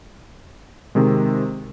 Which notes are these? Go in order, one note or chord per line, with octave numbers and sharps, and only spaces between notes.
C3 D#3 G#3